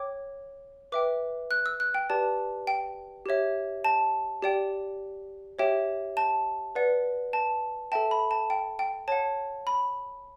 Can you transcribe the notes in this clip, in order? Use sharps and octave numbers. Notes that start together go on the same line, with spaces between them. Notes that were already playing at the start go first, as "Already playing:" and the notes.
Already playing: C#5 G5 D6
B4 E5 G5 D6
F#6
E6
F#6
G5
G4 B4 D5 A5
G5
G4 C#5 E5
A5
G4 D5 G5
G4 C#5 E5 G5
A5
B4 D5 F#5
A5
A4 E5 G5 A5
B5
A5
G5
G5
C#5 F#5 A5
B5